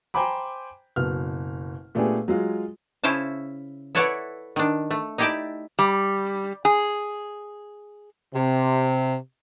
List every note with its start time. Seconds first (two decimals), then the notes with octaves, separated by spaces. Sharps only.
0.14 C5 G5 G#5 A#5 B5 D6
0.96 F#1 B2 F6
1.95 A#2 A3 B3 D4 G4 G#4
2.28 F#3 G#3 F4
3.04 C#3 C#4 E4 C5 A5
3.95 E4 A4 B4 C#5 D5 F#5
4.56 D#3 D4
4.91 A3
5.18 D#4 E4 G4 D5 G5 A5
5.79 G3
6.65 G#4
8.34 C3